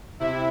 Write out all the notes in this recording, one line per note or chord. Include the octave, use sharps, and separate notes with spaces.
C3 E4